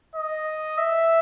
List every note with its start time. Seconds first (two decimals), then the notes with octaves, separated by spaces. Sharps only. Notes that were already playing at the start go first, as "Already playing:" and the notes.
0.15 D#5
0.78 E5